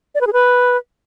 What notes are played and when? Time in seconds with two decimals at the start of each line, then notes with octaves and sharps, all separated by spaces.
0.15 D5
0.21 B4
0.27 G#4
0.33 B4